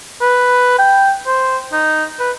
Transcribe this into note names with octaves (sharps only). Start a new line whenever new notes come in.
B4
G5
C5
D#4
B4